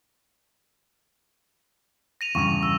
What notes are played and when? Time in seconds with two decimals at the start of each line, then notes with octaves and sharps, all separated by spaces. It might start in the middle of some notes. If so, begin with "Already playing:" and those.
2.21 A#6 D#7 F7
2.35 E2 G2 C#3 C#6 D#7
2.63 E6